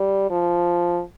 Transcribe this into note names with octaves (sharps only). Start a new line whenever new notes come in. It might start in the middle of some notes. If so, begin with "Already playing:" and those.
Already playing: G3
F3